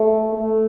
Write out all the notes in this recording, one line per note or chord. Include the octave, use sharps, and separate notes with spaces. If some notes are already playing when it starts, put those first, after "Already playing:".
Already playing: A3
A3